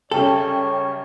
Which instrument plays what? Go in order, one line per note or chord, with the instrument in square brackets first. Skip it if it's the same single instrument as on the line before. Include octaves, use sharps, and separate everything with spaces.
[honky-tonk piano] F#2 C#3 G3 [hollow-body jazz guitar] A4 [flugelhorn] C#5 [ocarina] G5